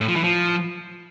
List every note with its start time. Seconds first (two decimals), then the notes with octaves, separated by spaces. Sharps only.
0.01 A2
0.08 F3
0.16 E3
0.24 F3